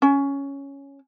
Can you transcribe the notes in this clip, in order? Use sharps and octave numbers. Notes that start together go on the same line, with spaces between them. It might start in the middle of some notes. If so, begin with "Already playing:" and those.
C#4